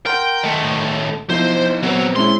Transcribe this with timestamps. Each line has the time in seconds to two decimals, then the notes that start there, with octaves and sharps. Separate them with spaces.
0.06 A#4 F#5 G5 C6 F6
0.43 D#3 A3
0.63 A2
1.30 F3 B3 D#4 E4 A4 C5
1.83 A#2 F#3 B3 C4 B4
2.16 G#3 C#4 E4 C6